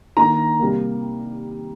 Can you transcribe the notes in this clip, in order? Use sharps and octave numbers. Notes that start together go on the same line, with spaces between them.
D#3 A#3 A#5
C3 G3 A#3